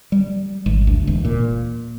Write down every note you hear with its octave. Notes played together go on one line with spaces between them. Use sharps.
G3
G#1
D2
E1
A#2